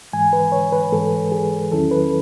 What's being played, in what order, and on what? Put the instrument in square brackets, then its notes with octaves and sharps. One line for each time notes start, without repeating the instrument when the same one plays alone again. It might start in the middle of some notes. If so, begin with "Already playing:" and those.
[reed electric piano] G#2 E3 G#3 G#5
B4
C#5
B4
G#2 E3 G#3 A4
G#4
E2 D#3 F#3 C#4 E4 A4
B4